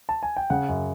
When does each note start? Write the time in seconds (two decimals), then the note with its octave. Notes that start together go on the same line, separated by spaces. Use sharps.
0.09 A5
0.23 G#5
0.37 G5
0.50 C#3 F#5
0.69 F#2